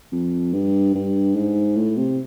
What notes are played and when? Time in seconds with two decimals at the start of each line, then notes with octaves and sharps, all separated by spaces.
0.12 F2
0.53 G2
0.95 G2
1.36 G#2
1.76 A2
1.97 C3